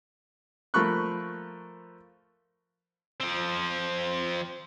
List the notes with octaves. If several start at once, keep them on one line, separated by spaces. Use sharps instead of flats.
F3 A3 A#4 B5 C#6 F#6
F3 C4